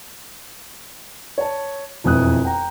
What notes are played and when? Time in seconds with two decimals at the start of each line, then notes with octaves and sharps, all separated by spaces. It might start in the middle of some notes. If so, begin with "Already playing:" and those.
1.38 C#5 A5
2.04 E1 F2 E3 D#6 F#6
2.45 G5 A#5